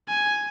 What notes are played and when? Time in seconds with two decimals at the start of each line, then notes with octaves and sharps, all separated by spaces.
0.08 G#5